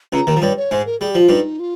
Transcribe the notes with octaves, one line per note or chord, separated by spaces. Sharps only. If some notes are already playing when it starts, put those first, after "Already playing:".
C#2 C#3 A#5
D#2 D#3
F3
G2 G3 C#5
C#5
G#2 G#3 C5
A#4
G3 G#4
G4
F3
F4
G2 G3 D#4
F4